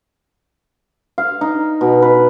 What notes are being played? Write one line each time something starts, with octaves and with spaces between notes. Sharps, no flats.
F5
D#4
B2
B4